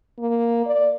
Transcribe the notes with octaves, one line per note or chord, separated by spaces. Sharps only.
A#3
D5